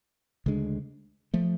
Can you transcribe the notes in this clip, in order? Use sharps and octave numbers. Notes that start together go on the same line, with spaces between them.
D2 C#3 G#3 D4
F3 A3